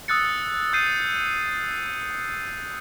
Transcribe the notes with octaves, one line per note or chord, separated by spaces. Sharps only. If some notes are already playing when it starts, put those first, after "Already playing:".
D#6 E6 F#6 A6 C#7
D#6 G6 C7 D#7